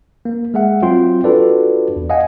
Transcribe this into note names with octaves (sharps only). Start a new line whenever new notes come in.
A#3
G#3 G#4 E5 F#5
F#3 C4 F4 G5 C6
D4 F4 F#4 A4 B4 D5
E2
D#5 F5 F#5 G#5